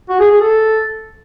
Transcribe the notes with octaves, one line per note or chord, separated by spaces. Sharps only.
F#4
G#4
G#4
A4